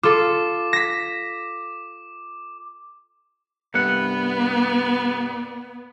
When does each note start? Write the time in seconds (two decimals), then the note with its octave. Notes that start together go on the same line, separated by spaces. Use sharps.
0.03 F4 A4 D6
0.73 A#6 B6
3.74 C2 G2 B3 F#5